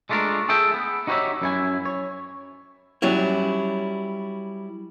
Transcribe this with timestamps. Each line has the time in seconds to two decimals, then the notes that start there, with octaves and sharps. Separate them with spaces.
0.09 G#3 A3 D4 F4 A#4
0.49 G#4 A4 E5 G5
0.74 B3
1.07 D#4 F#4 G4 B4 C#5 E5
1.42 F#2 E4 G#5
1.85 C#5
3.02 F#3 G3 C#4 E4